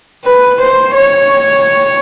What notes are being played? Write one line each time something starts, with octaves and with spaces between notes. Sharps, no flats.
B4
C5
C#5